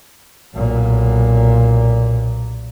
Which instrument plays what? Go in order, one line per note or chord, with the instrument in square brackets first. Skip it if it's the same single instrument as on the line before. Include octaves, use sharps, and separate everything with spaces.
[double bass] B1 A#2